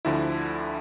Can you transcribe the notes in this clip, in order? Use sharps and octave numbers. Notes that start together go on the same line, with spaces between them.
D2 D3 F3 E4